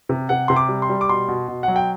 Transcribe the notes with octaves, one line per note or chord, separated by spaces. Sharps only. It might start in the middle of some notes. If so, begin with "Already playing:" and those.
C3
C3 F#5
C3 C6
D6
G3
C6
G3
D6
B2 C6
B2
B2
F#3 F#5
G5